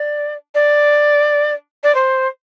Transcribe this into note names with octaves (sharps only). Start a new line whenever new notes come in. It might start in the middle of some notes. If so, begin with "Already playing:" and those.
Already playing: D5
D5
D5
C5